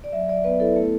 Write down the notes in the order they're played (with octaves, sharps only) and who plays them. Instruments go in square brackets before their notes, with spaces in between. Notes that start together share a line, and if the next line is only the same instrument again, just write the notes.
[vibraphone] D5
F#3 E5
F#3 D5
B3 B4
E4 A4
A3